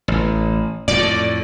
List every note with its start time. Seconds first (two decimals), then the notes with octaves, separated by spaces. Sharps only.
0.08 A1
0.88 F2 A2 D5